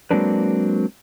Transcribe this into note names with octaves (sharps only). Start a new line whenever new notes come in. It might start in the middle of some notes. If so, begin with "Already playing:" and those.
F#3 G#3 A#3 C4 D4 B4